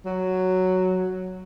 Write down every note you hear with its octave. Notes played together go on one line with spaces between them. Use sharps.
F#3